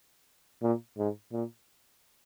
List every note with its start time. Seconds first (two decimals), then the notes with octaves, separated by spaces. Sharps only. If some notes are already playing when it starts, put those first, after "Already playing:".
0.62 A#2
0.98 G#2
1.32 A#2